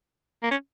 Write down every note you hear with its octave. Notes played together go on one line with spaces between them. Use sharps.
A#3
C#4